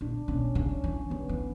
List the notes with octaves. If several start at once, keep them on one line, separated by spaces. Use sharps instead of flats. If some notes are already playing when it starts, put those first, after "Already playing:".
A#2 D4
B2 C#4
C#3 C#4
E3
D3 B3
E3